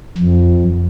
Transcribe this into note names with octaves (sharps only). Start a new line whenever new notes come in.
F2